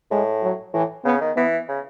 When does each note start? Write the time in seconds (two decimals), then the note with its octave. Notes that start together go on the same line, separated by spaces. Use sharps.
0.11 A2 G#3
0.42 F#3
0.74 A2 E3
1.05 C#3 B3
1.21 D#3
1.36 E3 B3
1.69 C#3